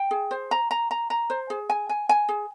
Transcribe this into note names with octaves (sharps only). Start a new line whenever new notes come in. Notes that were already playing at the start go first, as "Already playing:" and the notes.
Already playing: G5
G#4
C5
A#5
A#5
A#5
A#5
C5
G#4
G#5
G#5
G#5
G#4